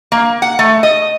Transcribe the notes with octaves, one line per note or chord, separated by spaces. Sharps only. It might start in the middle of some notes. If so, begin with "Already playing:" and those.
A#3
F#5
A3
D#5